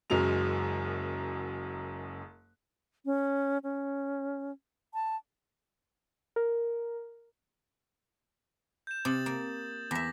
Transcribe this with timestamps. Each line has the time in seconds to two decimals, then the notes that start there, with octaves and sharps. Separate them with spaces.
0.10 F#1 F#2 F#3 G#3 F7
3.05 C#4
3.63 C#4
4.94 A5
6.36 A#4
8.87 G6 E7
9.05 C3 D#6 A6 F#7
9.26 A#3
9.91 E2 E5 D6 A#6 B6